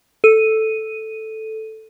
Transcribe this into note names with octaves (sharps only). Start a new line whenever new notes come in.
A4 D#7